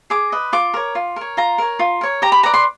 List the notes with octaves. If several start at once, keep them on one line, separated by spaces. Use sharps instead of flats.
G#4 D6
B4 D#5
F4 D6
A#4 C#5
F4
A#4 C#5
F4 A#5
A#4 C#5
F4
A#4 C#5
G4 A#5
B5
B4 D5 A#5
C6